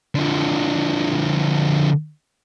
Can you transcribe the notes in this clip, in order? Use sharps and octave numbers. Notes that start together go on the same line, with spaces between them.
D3 F3